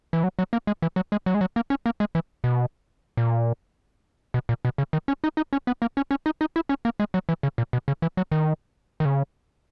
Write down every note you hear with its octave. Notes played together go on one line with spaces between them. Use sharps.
E3
F#3
F#3
A#3
G#3
E3
F#3
G#3
F#3
G#3
F#3
A#3
C#4
A#3
G#3
E3
B2
A#2
B2
A#2
B2
C#3
D#3
C#4
D#4
D#4
C#4
B3
A#3
C#4
C#4
D#4
D#4
E4
C#4
A#3
G#3
F#3
E3
C#3
A#2
B2
C#3
E3
F#3
D#3
D#3
C#3